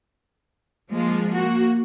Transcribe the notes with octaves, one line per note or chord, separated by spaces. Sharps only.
F3 G#3 A#3
A#3 F#4